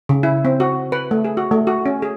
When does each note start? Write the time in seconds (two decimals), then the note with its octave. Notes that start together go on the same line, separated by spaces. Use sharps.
0.09 C#3
0.23 E4
0.45 C4
0.60 F#4
0.92 B4
1.11 A3
1.24 G#4
1.37 F#4
1.51 A3
1.67 F#4
1.86 C#4
2.02 G#4